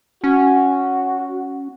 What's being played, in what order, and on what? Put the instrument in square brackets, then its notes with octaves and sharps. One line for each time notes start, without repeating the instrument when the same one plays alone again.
[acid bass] C#4 [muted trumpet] F#4